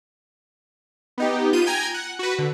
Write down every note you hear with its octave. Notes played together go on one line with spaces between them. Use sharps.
B3 D#4 G4
B3 F4 G6 D#7
G5 G#5 A#5 G#6
F#5
F#4 B4
D3